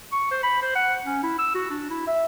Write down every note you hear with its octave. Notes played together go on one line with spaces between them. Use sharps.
C#6
C5
B5
C5
F#5
C#4
E4
E6
F#4
D4
E4
E5